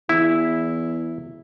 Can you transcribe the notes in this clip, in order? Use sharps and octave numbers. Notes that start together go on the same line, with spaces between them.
E2 E4